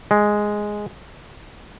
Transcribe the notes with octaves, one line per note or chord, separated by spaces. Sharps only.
G#3